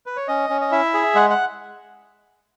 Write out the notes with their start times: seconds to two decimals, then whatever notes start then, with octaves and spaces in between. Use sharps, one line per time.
0.06 B4
0.17 C#5
0.28 C#4 D#5
0.49 C#4
0.61 D#5
0.72 E4 E5
0.94 G#4
1.15 G#3 F#5
1.30 F#5